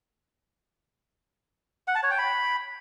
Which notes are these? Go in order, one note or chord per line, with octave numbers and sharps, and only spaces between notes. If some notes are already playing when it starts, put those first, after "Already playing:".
F#5
A5
C#5
G5
B5